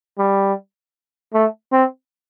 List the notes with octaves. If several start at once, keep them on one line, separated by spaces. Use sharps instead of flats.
G3
A3
C4